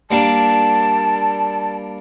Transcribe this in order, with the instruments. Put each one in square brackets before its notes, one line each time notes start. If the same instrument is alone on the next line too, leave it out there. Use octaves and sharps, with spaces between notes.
[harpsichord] G3 A#3 D4 [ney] A5